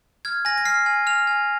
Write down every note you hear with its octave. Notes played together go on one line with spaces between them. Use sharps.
F6 G#6
G#5 A#6
A#6
F6 C7
G#5
F6 F7
G#5